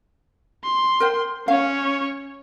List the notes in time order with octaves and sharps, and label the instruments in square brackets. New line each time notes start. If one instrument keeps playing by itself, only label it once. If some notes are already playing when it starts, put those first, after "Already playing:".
[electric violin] C6
[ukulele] A#4 C5 G5
[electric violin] C#4 C#5 [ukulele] F5